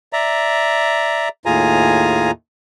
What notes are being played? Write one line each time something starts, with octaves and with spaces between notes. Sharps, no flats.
D5 E5 A#5
D#2 A2 F4 G#4 G#5 A#5